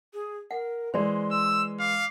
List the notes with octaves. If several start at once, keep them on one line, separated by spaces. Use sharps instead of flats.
G#4
A#4 F#5
E3 G#3 C5 D5 C6
E6
F5 D6